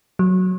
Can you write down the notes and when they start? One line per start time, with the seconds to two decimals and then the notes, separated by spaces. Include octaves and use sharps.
0.19 F#3